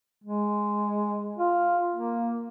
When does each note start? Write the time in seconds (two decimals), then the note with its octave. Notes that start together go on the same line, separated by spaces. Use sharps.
0.24 G#3
1.38 F4
1.95 A#3